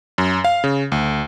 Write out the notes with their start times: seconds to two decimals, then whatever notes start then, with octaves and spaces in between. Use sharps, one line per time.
0.18 F#2
0.44 F5
0.64 C#3
0.92 D2